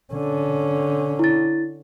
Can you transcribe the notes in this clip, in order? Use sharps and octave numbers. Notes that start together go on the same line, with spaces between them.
D3 C#4
E4 A6